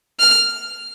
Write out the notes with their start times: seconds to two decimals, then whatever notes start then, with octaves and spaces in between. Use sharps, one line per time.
0.20 F6